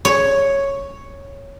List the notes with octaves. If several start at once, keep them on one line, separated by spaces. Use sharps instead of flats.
C#5